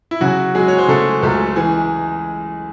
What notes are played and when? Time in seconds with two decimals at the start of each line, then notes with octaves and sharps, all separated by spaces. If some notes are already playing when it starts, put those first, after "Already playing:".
0.11 E4
0.21 C#3 F#3 F#4
0.55 F#3 G#3 G#4
0.68 C#5
0.78 C5
0.88 C#3 A3 A4
1.22 C#2 A3 A4
1.56 E3 G#3 G#4